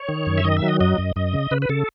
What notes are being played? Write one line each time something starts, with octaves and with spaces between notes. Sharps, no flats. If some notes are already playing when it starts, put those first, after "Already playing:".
Already playing: C#5
D#3
F#2
E5
D#3 D#5
E5
F#3
D#5
F#2 D#5
F#2
F#2 D#5
C#3
C#3 B4
B4
C#3 A4